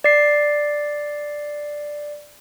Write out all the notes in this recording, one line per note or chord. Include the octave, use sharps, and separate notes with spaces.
D5 C7